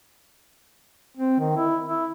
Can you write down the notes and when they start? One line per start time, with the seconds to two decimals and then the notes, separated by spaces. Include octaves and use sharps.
1.17 C4
1.40 D#3
1.57 E4
1.87 E4